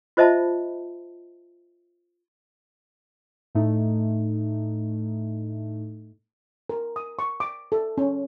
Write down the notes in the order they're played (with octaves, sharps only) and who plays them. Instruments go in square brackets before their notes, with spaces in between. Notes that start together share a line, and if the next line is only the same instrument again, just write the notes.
[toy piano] F4 C5 D#5 E5 A5 B5
[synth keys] A2 A3 D#4
[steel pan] A#4
D#6
C#6
D6
A4
C#4